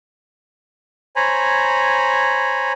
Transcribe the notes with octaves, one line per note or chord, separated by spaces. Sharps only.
C5 C#5 G#5 A#5 B5